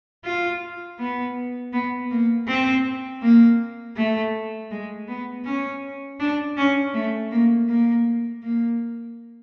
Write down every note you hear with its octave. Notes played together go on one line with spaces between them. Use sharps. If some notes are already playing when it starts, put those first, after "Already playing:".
F4
B3
B3
A#3
C4
A#3
A3
G#3
B3
C#4
D4
C#4
A3
A#3
A#3
A#3